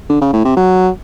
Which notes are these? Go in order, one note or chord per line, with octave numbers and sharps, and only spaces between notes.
D3
C#3
A2
C3
F#3